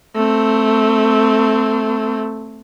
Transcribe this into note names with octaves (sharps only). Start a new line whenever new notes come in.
A3 C4